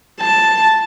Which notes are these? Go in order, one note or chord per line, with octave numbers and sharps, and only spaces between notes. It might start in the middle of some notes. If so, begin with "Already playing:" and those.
A5